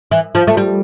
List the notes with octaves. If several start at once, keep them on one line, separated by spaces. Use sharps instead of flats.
E3
F3
A3
G3